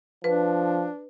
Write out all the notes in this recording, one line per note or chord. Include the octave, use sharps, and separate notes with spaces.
F3 D4 B4